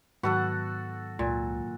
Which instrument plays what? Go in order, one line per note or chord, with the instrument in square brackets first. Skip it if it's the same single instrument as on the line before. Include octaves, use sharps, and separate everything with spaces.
[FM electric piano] G#2 D#3 F#3 [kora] B3 [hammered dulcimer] F#4 A4 F#5
[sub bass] C#2 [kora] A#2